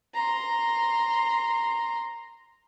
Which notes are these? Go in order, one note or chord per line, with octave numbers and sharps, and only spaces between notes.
A#5 C6